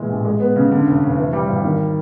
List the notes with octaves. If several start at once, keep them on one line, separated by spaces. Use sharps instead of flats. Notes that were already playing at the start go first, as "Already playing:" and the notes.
Already playing: A#2 E3 G#3
A1
G#3
B3
C#3
D3
F1
F1
E3
G3
G#1
D#3